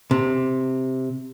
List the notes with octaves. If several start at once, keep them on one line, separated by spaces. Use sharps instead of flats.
C3